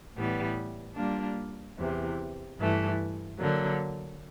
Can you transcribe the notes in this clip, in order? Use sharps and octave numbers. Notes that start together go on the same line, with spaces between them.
A2 E3 G3 B3
G3 A#3 D4 F4
E2 C3 E3
G2 E3 A3
D3 F#3 A#3